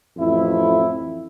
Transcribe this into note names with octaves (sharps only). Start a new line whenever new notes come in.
A1 F2 E4